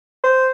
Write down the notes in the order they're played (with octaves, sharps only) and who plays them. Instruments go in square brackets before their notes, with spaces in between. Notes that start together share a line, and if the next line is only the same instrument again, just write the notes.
[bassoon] C5